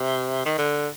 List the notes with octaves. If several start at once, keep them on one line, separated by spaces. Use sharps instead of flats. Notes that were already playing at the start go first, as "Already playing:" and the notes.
Already playing: C3
D#3
D3